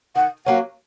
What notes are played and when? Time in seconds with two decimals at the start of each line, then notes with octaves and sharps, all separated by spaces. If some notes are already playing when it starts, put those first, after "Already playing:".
0.16 D#3 F#5
0.46 F#3 A#3 C#4 F#5